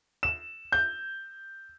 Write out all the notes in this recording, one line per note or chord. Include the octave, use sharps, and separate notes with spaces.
E7
G6